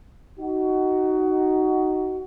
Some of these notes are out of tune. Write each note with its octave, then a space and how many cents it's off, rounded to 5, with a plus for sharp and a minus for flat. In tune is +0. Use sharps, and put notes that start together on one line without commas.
D#4 +0 F#4 +15